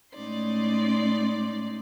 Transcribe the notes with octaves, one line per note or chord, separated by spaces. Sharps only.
A2 G#3 C#4 D#4 D5 C6